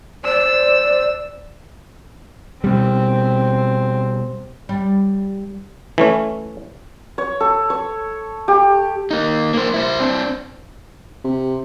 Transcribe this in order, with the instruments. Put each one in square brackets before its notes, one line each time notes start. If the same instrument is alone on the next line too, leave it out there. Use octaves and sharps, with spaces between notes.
[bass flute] C5 [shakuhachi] D5 [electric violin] E6
[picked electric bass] B2 G3 [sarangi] C4
[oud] G3
[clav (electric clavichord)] E3 A3 C#4
[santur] C#5
A4
C#5
G4
[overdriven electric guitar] A#3 D#4
A#3 C5
E4 C5
C4 D4
[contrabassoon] C3